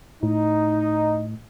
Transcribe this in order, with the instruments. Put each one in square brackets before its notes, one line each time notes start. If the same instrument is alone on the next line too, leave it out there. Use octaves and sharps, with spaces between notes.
[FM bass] A2 [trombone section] D#4